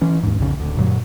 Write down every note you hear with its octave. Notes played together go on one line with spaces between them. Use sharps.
E3 C#4
D#2 G#2
B1 F2 C#3
D1 D2
F#2 A#2 F#3